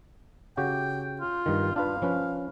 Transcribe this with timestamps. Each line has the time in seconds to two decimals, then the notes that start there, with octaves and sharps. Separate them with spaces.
0.57 C#3 F#4 G4 G5
1.21 F4
1.46 G2 D#3
1.76 D4 F4 B4 F5
2.02 F3 C#4 B4